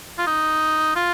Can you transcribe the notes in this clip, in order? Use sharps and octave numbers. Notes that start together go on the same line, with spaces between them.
F4
D#4
F4